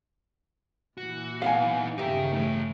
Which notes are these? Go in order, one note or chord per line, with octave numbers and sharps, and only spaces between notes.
A#2 E3 F#4
B3 D#4 F5 F#5 G#5
G1 C#3 D#4 G4 A#4 E5
E3 A3